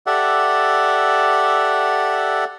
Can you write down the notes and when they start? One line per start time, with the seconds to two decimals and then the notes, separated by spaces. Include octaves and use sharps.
0.07 G4 A4 D5 E5 F#5